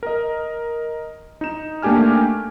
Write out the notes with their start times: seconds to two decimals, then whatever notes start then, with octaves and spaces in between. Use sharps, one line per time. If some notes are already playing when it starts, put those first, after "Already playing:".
0.03 A#4 D#5
1.41 D#4 E7
1.82 A3 A#3 D4 G4 G#5 F6